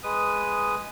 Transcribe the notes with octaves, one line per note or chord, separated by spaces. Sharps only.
G#3 B4 D#6